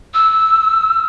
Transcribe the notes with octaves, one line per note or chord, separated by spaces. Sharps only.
E6